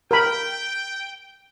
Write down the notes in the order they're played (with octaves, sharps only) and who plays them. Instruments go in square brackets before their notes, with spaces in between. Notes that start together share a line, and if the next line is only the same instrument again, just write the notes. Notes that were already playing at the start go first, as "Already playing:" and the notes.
[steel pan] A#4 B5 [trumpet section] G5